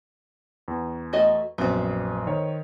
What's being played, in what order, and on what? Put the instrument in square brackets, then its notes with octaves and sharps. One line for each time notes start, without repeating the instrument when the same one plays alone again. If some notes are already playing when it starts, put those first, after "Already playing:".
[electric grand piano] E2
[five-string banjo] A3 F#4 D#5
[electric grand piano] A#1 F#2 [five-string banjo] B3 C4
[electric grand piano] D#3 C5 C#5